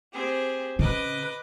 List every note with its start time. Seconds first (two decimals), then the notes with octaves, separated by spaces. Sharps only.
0.12 C4 G4 G#4
0.79 C#3 B4 D#5 D6